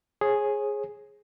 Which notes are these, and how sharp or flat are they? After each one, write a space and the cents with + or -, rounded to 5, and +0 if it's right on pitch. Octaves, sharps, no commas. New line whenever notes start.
G#4 +0 C#5 -40